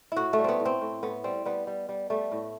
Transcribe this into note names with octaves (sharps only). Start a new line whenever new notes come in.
A2 E4 F#4
A3
G3
B3 C4
A2
C4
A2
A2 B3
G3 C4
G3 B3
G3
G3
G3 A3
A2